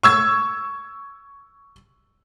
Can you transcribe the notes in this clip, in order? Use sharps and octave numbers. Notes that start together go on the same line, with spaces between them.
C#6 E6 G#6